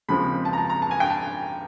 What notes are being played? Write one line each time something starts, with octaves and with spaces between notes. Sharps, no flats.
D#2 C#3 F3 G#3 C4 B5
A5
A#5
A5
A#5
A5
G#5
G5
A5